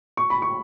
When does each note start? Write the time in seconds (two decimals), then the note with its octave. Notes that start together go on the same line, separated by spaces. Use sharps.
0.17 C#6
0.30 B5
0.42 C#6